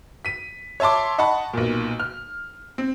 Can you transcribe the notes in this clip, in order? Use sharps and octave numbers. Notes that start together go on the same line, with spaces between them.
B6 D#7
C#5 E5 A5 C6 D6
D#5 F#5 A5 B5 C#6
B1 A#2
F6
C4